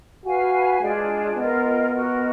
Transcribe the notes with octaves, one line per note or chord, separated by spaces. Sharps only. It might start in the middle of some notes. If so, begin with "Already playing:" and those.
F#4 B4 F5 G#5
G#3 D4 F4 G#4
B3 F4 A#4 D#5
F#4 A#4 D#5